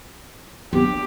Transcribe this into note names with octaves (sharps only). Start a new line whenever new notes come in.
B3 D4 G4